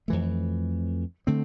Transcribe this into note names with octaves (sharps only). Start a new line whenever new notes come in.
F2 E3 A3
D3 A3 C4